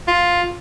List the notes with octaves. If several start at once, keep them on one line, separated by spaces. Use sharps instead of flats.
F4